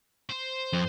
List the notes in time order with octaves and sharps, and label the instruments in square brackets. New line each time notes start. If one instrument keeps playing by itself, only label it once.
[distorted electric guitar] C5
[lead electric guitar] F2